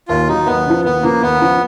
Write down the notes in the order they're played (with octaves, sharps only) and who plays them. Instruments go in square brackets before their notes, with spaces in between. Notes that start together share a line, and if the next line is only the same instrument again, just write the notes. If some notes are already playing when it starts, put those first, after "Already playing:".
[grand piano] D#2 [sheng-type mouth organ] F4
[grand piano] D#3 F#3 [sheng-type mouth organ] D#4
[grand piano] D#2 [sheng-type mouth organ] B3
[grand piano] C#3 F3
[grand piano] D#2 [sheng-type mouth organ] B3
[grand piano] C#3 F3 [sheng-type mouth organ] A#3
[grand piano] D#2 [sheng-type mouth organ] B3
[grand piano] C#3 F3